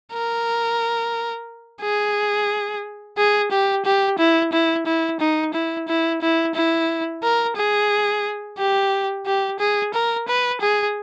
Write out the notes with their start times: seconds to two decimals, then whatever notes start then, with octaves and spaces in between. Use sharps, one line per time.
0.13 A#4
1.82 G#4
3.18 G#4
3.51 G4
3.85 G4
4.19 E4
4.53 E4
4.86 E4
5.20 D#4
5.54 E4
5.88 E4
6.22 E4
6.55 E4
7.23 A#4
7.57 G#4
8.58 G4
9.26 G4
9.59 G#4
9.94 A#4
10.28 B4
10.61 G#4